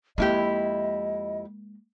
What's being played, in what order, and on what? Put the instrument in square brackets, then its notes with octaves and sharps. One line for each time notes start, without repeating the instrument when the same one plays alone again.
[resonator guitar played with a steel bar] F2 E4 G4 [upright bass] G#3 A#3 [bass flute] D#5